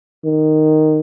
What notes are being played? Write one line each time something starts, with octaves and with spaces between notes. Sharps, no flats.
D#3